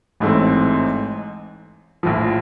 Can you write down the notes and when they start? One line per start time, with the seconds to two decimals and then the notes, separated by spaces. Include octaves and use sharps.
0.20 A1 G#2 E3 A3 C4
2.03 A#1 A2 F3